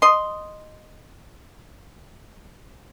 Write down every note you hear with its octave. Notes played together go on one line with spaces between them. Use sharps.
D#5 C6